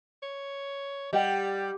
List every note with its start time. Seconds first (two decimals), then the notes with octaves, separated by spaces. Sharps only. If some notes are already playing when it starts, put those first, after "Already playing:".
0.22 C#5
1.13 G3 G4 D#5 F#5 G5